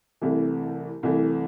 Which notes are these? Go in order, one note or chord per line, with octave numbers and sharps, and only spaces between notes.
C2 C3 E3 A3
C2 C3 E3 A3